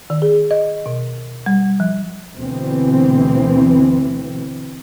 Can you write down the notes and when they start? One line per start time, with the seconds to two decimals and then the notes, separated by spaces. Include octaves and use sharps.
0.10 D#3
0.22 G#4
0.51 D#5
0.86 B2
1.46 G3
1.80 F3
2.34 D2 B2 E3 C4